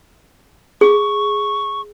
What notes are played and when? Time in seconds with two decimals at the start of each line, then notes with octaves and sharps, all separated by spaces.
0.81 G#4 C#6